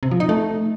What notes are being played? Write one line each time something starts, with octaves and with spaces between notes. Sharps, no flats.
C3
F3
D#4
A3